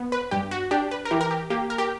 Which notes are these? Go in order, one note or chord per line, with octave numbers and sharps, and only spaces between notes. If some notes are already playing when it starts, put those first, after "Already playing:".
Already playing: B3
B4
G2 G4
F#4
D4 G4
B4
A#4
E3 G4
A#4
G4
A#3 G4
A#4
G4